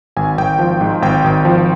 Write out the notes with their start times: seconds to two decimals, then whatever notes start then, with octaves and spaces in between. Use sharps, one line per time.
0.16 G#1 G#5
0.38 G#1 G5
0.59 F3
0.81 G#2
1.02 G#1 G5
1.24 G#1
1.45 F3